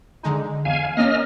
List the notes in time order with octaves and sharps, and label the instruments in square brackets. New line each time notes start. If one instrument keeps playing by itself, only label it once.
[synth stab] D3 G#3 D#4
[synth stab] E2 [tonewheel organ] F5 G#5
[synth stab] A#3 C#4 [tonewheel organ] D#5 F6